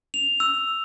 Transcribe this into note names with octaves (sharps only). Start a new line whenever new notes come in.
F7
E6